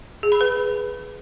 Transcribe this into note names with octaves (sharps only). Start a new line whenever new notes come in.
G#4
B5
B4